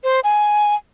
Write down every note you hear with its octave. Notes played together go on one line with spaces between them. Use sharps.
C5
G#5